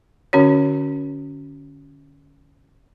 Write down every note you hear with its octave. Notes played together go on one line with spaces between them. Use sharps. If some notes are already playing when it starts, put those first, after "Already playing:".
D3 C#4 F#4 C#5